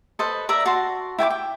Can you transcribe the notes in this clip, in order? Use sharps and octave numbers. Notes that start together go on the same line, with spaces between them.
A4 B4 C5 D#5
A#4 D5 E5 A#5
F#4 A5 C6
E4 G5 G#5 D6
G5